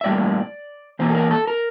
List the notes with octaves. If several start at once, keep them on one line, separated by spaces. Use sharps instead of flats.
E5
A2 G3 A#3 D5
E2 E3 A#3 C5
A4
A#4
A4
A#4